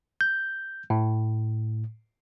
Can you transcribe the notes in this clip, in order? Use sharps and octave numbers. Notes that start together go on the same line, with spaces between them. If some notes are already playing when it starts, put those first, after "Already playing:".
G6
A2